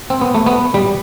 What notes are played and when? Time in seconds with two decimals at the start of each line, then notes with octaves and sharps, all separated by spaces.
0.10 C4
0.21 B3
0.35 A3
0.46 B3
0.74 G3